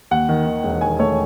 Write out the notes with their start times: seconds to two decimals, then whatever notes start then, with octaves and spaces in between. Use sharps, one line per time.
0.11 D#2 F#5
0.29 D#3
0.47 D#3
0.64 E1
0.81 D#3 G#5
0.99 A3 C#5